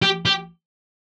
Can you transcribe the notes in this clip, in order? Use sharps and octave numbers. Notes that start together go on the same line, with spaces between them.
G4
G4